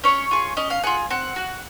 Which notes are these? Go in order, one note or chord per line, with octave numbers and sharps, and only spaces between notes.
C#4 C#5
F4 G#4
C#4 D#5
F5
F4 G#4 F#5
C4 F#5
F#4